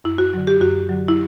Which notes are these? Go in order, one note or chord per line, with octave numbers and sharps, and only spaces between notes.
F#2 E4
F#4
D3 F#3
G4
F#2 F#4
D3 F#3
E4